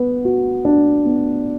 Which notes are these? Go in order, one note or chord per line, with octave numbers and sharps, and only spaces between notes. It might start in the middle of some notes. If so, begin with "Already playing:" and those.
Already playing: B3 B4
F#4
D4
B3